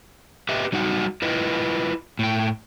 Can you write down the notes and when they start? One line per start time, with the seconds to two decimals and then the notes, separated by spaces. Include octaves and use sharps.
0.49 G4 B4 D#5 E5
0.73 F#3 G3 D#4 F#4 F#5
1.22 E4 F4 B4 D#5
2.19 A2 G5